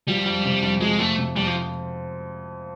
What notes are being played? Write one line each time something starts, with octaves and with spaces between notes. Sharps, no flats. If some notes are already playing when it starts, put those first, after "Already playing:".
F3 G3
F2
C3
F2
F3 G#3
F2 A3
C3
F2 G3
F3